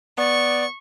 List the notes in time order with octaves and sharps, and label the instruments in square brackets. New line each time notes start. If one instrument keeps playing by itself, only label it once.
[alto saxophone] B3 [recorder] D5 [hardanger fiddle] C#6